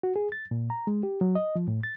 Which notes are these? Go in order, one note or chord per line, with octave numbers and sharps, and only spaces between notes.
F#4
G#4
A6
A#2
A#5
G#3
G4
F#3
D#5
F3
A2
A6